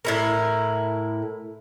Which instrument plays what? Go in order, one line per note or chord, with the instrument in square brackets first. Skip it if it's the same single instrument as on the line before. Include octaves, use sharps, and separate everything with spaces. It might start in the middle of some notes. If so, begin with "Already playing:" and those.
[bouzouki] A2 E4 A#4